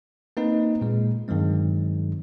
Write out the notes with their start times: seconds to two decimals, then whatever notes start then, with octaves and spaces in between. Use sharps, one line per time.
0.37 A#3 C4 D#4 B4 D#5
0.81 A#2 G#3
1.28 G2 D#3 F#3 G#3 C4